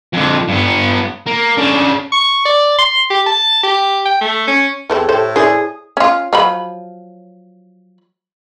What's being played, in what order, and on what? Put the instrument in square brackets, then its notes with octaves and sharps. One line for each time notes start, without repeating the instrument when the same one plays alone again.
[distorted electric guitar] F2 D3
G2 B3
A#3
C#3 D4
[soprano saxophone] C#6
D5
C6
G4
A5
G4
G5
A3
C#4
[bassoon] E2 [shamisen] G3 A3 C4
[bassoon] A2 [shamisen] G4 A4 C5
[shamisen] E4 C5 D5 [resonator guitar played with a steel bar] G#4
[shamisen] C#4 F4
F3 F#3 B5